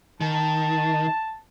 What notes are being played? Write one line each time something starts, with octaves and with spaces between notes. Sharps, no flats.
D#3 A5